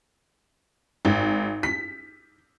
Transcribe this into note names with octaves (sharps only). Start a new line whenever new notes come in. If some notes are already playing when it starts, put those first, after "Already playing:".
G#1
B6